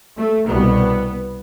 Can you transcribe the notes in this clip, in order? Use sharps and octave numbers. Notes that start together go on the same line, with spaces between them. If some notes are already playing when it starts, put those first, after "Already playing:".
A3
C2 B2 B3